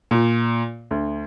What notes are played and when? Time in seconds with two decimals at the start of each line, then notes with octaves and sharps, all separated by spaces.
0.11 A#2
0.91 D2